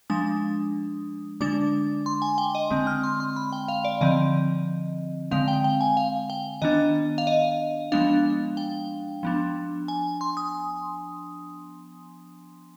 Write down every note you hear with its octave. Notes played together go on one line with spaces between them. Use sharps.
F3 G#3 D4 D#6
D3 G#3 D4 D6
C6
G#5
G5
D#5
D3 G#3 C4
F6
C6
C6
B5
G5
F5
D5
D3 F3 C4 D#5
D3 G#3 C4 F5
G5
G5
G#5
F5
G5
D#3 B3 D4 D#5
F5
D#5
F3 G#3 B3 D4 F5
G5
F3 B3 D4
G#5
C6
D#6